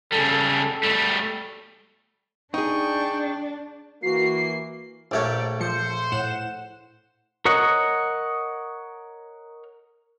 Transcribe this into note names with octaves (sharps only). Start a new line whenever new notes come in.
C#3 G3 A4
G3 A3
D4 D#4 G#4 G5 C#6
E3 A#3 F#4 C7
A#1 A3 G4 A#4 C#5 D5
F3 C5 C#7
A2 F#5 E7
A#4 C#5 D#5 F#5